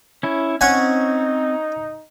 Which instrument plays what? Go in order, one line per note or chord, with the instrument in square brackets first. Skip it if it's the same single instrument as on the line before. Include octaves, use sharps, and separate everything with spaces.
[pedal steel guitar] C#4 E4
[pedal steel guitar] C4 [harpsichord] C#4 F#5 G#5 [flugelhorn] D#4